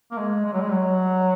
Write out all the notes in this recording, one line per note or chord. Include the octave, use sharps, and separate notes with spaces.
A#3
G#3
G#3
F#3
G#3
F#3